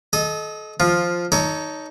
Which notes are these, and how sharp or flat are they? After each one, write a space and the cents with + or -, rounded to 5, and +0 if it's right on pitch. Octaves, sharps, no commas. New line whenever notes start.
A4 -35 D#5 +0
F3 +0 F4 +10
D#4 +5 A4 +0 C#5 +30